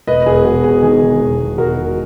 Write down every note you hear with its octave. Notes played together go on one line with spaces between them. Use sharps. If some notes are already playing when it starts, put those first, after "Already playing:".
E1 B4 D#5
E1 G#4
E1 F#4
E2 G#4
D#3 G#4
D#3
E1
E1
E1 F#4 A#4
E1